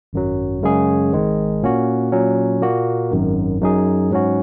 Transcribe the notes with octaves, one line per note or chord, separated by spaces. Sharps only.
G#1 F#2 F#3
F#2 C#3 G#3 C#4 G#4
G#1 G#2 D#3 G#3
A#2 A#3 C#4 F#4
A#2 F#3 C#4
A#2 A#3 F#4
G#1 F#2 D#3
F#2 F#3 D#4 G#4
G#2 F#3 C#4 F#4